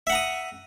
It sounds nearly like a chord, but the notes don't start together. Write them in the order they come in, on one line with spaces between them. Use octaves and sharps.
E5 F#5 A#5 D#6